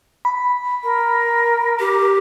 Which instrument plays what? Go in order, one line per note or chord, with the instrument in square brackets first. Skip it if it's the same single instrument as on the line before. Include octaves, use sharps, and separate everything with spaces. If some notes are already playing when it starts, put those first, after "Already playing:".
[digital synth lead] B5
[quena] A#4
[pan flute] G4